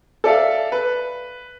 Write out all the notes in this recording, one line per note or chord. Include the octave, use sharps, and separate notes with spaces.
A4 D5 E5 F5
B4